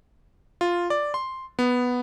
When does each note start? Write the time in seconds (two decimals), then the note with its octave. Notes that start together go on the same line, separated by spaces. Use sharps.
0.61 F4
0.90 D5
1.14 C6
1.59 B3